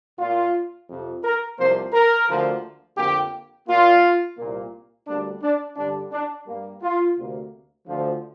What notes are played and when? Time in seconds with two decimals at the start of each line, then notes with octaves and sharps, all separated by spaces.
0.18 A#2 A#3 F4
0.88 F2 C3 F3
1.23 A#4
1.58 C2 C3 F3 A#3 C5
1.92 A#4
2.28 D2 D3 F3 A#3
2.97 F2 D3 A#3 G4
3.67 A#2 A#3 F4
4.37 C2 A#2 A#3
5.06 D2 D3 G3 A#3 D4
5.41 D4
5.76 G2 D3 G3 D4
6.11 D4
6.46 G2 G3 A#3
6.81 F4
7.16 D2 C3 A#3
7.86 D2 D3 F3